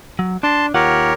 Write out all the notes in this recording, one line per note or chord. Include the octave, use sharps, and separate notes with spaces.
F#3
D4 A5 C6
D#2 F4 G4 A#4 C#5 F#5